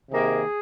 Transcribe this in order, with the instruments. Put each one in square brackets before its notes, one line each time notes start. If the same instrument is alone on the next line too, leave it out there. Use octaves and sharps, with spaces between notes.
[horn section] C3 D#3 A#3 G#4